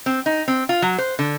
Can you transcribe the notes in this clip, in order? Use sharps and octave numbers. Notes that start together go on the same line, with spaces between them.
C4
D#4
C4
F4
F#3
C5
D3